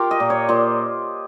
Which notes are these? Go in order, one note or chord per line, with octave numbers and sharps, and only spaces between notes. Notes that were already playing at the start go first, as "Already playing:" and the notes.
Already playing: F4 G4 A#4
D#5
A#2
C#5
A#2 C5